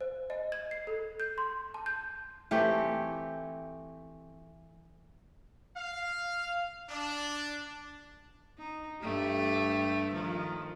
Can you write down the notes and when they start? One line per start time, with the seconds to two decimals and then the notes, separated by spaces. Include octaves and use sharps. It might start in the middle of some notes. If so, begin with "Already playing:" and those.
0.01 C5
0.30 D#5
0.52 G#6
0.71 C7
0.87 A4
1.20 G6
1.38 C6
1.74 A5
1.86 G6
2.51 E3 A3 C4 G4
5.76 F5
6.89 D4
8.58 D#4
9.02 G2 A3 G4
10.13 D#3 F3